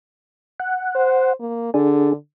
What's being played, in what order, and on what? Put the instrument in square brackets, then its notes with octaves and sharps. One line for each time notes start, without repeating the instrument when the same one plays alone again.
[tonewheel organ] F#5
[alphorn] C5
A#3
[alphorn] D3 [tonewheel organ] D4 G#4